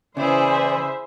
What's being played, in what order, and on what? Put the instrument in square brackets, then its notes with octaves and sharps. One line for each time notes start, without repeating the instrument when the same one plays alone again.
[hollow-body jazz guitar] C#3 [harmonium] E3 D5 [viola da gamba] E4 G#4 [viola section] C5 E5